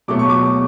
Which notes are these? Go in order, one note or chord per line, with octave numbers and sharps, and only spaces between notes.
B2 F#3 A3 D6
C#6
D6